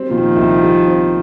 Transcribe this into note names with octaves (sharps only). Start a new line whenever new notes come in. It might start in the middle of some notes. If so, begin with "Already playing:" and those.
Already playing: G3 C4
A#2 D#3 F3
C2
G3
C4